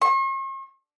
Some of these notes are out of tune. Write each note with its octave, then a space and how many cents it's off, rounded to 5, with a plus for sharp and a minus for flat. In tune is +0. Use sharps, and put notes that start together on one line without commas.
C#6 -45